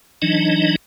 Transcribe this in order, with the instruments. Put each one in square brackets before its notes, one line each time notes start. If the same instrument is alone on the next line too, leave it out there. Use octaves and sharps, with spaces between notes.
[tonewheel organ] E3 F#3 D4 D#4 D#5